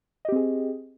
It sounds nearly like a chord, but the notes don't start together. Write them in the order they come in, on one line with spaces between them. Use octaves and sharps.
D#5 G4 C4 G#4